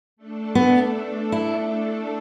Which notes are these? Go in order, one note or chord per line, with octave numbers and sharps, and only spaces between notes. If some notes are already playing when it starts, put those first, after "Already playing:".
A3 D4 A4
B3
E4